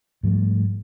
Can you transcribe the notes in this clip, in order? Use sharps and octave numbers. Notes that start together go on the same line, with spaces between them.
G#2 F3 G3 A3